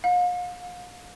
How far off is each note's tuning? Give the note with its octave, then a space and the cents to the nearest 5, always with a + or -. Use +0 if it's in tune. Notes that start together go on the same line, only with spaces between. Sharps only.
F5 +40